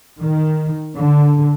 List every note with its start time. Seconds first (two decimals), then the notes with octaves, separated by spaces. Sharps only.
0.22 D#3
0.97 D3